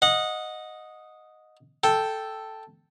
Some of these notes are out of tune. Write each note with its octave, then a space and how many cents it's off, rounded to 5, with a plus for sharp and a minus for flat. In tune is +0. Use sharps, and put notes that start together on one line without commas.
D#5 +0 F#5 -25
A4 +0 G5 +0